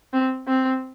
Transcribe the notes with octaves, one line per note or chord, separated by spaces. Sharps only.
C4
C4